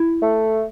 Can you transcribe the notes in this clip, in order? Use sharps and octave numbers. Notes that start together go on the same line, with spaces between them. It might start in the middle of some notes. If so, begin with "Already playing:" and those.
Already playing: E4
A3